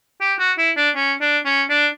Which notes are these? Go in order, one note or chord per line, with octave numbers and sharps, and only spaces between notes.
G4
F#4
E4
D4
C#4
D4
C#4
D4